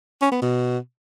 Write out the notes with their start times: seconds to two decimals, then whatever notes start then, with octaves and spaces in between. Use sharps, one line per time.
0.22 C#4
0.32 B3
0.42 B2